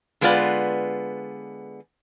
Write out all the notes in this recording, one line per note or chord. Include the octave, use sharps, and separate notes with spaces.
D3 G#3 B3 F4 B4 D5